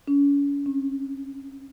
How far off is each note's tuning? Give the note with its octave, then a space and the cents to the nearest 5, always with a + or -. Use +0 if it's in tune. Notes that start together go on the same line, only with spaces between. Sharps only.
C#4 +35
C#4 -35